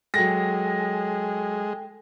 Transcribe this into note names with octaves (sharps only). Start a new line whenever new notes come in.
F#3 G#3 A4 G5 G#5 A#6